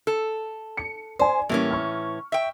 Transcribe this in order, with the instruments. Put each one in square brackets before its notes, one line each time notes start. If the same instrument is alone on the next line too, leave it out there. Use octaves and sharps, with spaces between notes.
[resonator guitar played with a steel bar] A4
[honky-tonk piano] C#7
[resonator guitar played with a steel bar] C5 [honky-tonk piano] D5 G#5
[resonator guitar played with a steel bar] A2 E3 C#4 [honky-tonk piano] G3 A#3
[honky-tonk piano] C#6 F6
[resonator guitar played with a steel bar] E5 G5